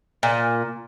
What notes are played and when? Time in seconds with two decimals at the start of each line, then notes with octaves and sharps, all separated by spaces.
0.23 A#2